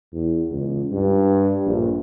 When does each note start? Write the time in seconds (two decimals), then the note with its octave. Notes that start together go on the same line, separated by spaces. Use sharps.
0.13 E2
0.52 C#2
0.93 G2
1.66 A#1